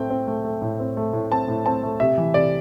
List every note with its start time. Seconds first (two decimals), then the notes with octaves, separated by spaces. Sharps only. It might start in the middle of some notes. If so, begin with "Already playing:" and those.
Already playing: A2 A3 C4 G5
0.10 C4
0.27 A3
0.44 A3
0.62 A2
0.80 C4
0.97 A3
1.13 A2
1.32 C4 A5
1.48 A2
1.66 C4 A5
1.83 A3
2.00 C3 E5
2.18 E3
2.34 C3 D5